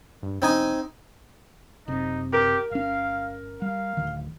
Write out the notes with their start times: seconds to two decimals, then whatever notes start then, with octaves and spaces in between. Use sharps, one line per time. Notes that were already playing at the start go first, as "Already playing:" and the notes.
0.23 G2
0.42 E1 C4 D#4 G#5
1.88 F#1 C3 D#4
2.33 G4 A#4
2.71 G1 C#4 F5
3.62 G3 F5
3.97 D1 D2 D#3